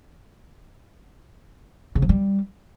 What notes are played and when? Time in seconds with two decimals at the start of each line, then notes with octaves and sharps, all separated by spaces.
1.95 C#3
2.02 F3
2.09 G3